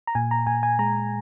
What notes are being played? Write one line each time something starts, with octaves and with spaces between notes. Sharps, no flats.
A#5
A#2 G#5
A#5
A#2 G#5
G#5
G#3 A#5